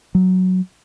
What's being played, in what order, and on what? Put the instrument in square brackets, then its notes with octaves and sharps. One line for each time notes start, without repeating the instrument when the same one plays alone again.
[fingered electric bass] F#3